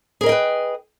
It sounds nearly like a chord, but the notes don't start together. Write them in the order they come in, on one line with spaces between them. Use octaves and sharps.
G#4 A#4 D#5 G5 B4